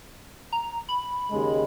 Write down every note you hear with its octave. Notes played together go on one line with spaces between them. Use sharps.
A#5
B5
D#2 C#3 G#3